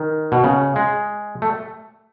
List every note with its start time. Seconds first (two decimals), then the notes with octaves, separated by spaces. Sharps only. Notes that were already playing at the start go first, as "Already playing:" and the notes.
Already playing: D#3
0.32 B2
0.44 C#3
0.76 G#3
1.42 A3